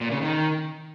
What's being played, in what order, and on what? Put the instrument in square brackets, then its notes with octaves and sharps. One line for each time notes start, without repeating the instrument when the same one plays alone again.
[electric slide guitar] A#2
C#3
D#3